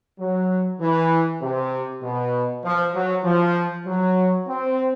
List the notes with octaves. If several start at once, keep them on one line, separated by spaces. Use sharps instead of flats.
F#3
E3
C3
B2
F3
F#3
F3
F#3
C4